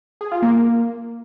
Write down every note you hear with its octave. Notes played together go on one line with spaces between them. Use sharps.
G#4
F4
A#3